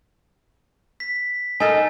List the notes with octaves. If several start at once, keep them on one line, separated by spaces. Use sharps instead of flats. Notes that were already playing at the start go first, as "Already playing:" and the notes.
B6
D#4 A4 A#4 G#5